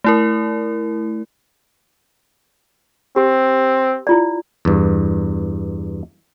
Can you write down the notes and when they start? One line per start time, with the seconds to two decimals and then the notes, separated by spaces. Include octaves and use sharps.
0.04 A3 E4 A#4
3.16 C4 G4
4.07 E4 F4 D5
4.65 E2 G2